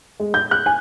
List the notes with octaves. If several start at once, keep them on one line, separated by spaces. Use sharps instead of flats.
G#3
G6
F#6
G#5